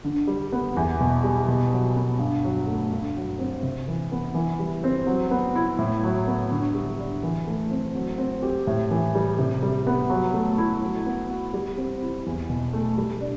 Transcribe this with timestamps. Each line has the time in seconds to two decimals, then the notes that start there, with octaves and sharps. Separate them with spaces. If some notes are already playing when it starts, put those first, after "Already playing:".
0.04 D3
0.27 G3
0.52 B3
0.76 E2
1.00 B2
1.24 G3
1.48 B2
1.72 F#3
1.96 B3
2.19 G2
2.44 F#3
2.67 A3
2.92 G2
3.16 F#3
3.39 C4
3.63 C3
3.88 E3
4.12 B3
4.35 E3
4.59 G3
4.84 C4
5.07 F#3
5.31 B3
5.56 E4
5.79 A2
6.04 F#3
6.27 B3
6.51 D3
6.74 G3
6.99 D4
7.23 E3
7.47 A3
7.71 C4
7.95 F#3
8.18 C4
8.42 G4
8.67 A2
8.91 E3
9.15 G3
9.38 C3
9.63 G3
9.87 B3
10.10 F#3
10.34 A3
10.58 E4
10.82 F#3
11.06 B3
11.30 F#4
11.53 G3
11.77 C4
12.02 E4
12.26 E2
12.49 B2
12.73 A3
12.97 G3
13.21 D4